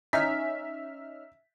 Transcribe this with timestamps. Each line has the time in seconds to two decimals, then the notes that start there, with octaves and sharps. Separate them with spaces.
0.13 C#4 D#4 E5 F6 B6